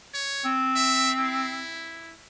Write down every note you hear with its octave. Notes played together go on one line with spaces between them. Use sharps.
C#5
C4
E5
E4